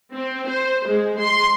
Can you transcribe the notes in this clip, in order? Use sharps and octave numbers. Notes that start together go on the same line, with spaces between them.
C4
C5
G#3
C6